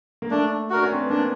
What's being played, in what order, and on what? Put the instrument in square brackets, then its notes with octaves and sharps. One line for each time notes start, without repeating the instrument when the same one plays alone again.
[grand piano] A#3
[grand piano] A3 [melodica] D4
[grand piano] D4 [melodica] F#4 A#4
[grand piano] C#4
C4
B3
[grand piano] A#3 [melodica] D4